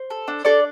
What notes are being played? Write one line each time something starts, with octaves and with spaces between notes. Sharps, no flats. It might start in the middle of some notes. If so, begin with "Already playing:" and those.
Already playing: C5
A4
D4
D4 A4 D5